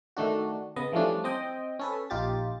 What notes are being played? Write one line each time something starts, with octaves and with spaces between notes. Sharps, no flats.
D#3 A3 D4 F#4
C#3 B3 D#5
E3 F3 G3 A3 C#4 D4
C4 D#5 G5
C#4 A4 B4
A#1 D#4 F4 G4 A6